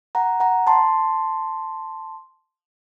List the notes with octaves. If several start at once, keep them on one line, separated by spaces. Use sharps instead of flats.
F#5 A#5
F#5 A#5
A5 C6